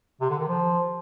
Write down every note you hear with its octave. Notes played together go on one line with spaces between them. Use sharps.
C3
D3
D#3
F3